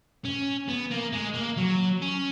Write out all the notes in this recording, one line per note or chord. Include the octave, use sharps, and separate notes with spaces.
C#4
B3
A#3
G#3
A#3
F#3
C#4